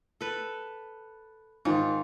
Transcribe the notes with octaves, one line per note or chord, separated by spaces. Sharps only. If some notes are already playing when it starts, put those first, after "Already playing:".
A4 B4
G#2 D#3 F4